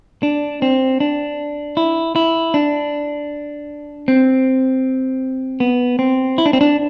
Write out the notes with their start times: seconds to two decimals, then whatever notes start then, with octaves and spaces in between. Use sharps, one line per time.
0.23 D4
0.62 C4
1.00 D4
1.77 E4
2.16 E4
2.54 D4
4.08 C4
5.60 B3
5.99 C4
6.38 E4
6.46 D4
6.53 C4
6.61 D4